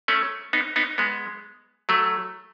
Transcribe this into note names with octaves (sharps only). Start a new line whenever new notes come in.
A3 C#4
B3 D#4
B3 D#4
G#3 B3
F#3 A3